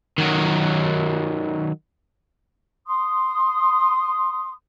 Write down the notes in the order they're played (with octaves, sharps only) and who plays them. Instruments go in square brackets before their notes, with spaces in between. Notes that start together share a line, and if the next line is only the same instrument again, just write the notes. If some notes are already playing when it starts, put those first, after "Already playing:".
[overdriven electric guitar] D#3 F#3
[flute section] C6 D#6